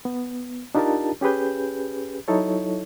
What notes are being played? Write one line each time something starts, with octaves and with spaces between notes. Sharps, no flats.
B3
D4 D#4 F4 G4 A#4 A5
C#4 G4 G#4 B4 G6
F#3 D#4 E4 A4 C#5